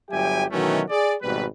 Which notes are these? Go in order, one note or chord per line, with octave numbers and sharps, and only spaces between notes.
G1 F#3 G4 E5 G5 G#5
B2 D#3 E3 F#3 A3 C#4
G#4 D5
G#1 B2 G3 B4